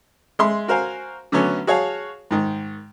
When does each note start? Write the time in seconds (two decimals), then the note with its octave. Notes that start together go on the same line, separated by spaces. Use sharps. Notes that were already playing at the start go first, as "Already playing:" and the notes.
0.39 G#3 E5 C6
0.68 F#4 A#4 C5 F5 G#5
1.32 D3 F#3 A3 B3 C#4
1.67 F#4 G#4 C#5 F5 A5
2.31 G#2 D#3